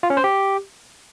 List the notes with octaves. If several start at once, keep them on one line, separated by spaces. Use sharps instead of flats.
F4
C#4
C5
G4